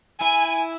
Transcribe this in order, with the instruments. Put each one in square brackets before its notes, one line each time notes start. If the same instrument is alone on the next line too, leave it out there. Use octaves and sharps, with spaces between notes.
[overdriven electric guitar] E4 [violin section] G#5